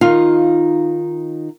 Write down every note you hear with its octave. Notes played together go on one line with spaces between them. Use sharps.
D#3 D#4 F4 F5